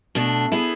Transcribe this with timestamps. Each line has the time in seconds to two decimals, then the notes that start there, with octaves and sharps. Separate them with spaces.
0.15 B2 A3 D4
0.52 B3 E4 G#4